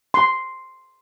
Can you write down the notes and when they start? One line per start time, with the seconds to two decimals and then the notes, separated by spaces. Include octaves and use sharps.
0.14 C6